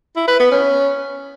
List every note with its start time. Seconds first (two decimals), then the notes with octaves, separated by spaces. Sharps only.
0.16 E4
0.28 B4
0.40 B3
0.52 C#4